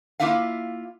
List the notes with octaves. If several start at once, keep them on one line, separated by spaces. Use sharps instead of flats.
A#3 B3 E4 F4 E5 F5